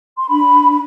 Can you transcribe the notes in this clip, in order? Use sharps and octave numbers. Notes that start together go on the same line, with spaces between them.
C6
D4 B5
B5